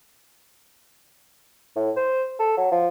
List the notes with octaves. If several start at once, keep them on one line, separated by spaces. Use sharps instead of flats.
A2
C5
A4
F#3
F3